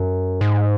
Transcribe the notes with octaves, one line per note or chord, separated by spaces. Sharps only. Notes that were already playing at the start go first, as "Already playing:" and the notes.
Already playing: F#2
G#2